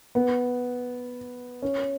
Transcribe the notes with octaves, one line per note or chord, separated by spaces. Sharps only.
B3
C#4